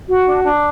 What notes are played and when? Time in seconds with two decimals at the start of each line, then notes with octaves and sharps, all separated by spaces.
0.08 F#4
0.26 D4
0.44 D4